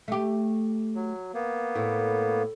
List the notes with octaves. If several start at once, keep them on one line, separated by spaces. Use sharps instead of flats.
A3 G4
F#3
A#3 B3
A2